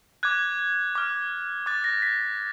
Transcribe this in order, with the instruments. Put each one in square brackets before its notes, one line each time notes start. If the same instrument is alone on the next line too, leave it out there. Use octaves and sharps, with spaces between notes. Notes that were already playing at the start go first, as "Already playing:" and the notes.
[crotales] D6 F#6 G#6
D6 F6
D6 F#6 A6
A#6
B6